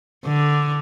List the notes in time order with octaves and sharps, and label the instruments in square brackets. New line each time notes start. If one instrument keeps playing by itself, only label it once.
[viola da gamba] D3